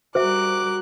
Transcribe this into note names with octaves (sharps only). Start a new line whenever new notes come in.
G3 F#4 A#4 C5 E5 D6 F#6